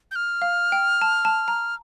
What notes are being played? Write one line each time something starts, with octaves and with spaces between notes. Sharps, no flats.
G6
F6
F5
G5
A5
A5
A#5